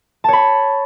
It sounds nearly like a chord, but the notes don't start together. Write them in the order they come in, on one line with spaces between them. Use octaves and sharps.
A5 C#5 B5